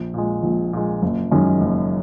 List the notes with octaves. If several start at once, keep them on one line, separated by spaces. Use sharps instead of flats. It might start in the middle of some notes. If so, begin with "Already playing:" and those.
Already playing: A#1
A#2 G#3
A#1
A#2 G#3
F#1
F#2 D#3 G#3 C#4
F#1